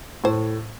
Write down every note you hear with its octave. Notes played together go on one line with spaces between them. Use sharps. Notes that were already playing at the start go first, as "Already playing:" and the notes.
A2 C5